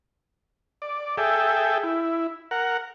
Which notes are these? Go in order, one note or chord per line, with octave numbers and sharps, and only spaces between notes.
D5
G#4 A4 E5 G5
E4
A#4 F#5